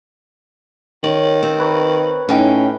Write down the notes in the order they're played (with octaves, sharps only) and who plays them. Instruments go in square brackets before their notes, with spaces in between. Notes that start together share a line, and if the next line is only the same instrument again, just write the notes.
[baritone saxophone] D#3 [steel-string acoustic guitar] C#5
[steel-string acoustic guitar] C4
[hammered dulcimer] B4 C#5 A#5
[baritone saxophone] A2 [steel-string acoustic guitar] C#4 D#4 G5